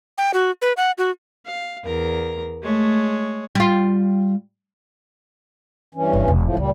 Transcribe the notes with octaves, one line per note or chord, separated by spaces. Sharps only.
G5
F#4
B4
F#5
F#4
F5
E2 A#4 A#5
G#3 A3 C#5
G3 F4
G2 E3 C#4
G1
E1
A2 F3
C#2 A#2 G3